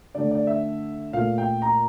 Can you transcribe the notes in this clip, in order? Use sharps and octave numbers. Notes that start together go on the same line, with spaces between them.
D3 A3 D5
D5
E5
A#2 A3 F5
G5
A#5